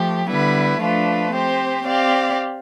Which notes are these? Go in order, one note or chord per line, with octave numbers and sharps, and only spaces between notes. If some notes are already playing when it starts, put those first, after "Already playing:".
Already playing: F3 A3 G4
D3 G3 B3 E4 B4
F3 A3 D4 F4 B4
C4 G4 C5
C4 G4 D5 F5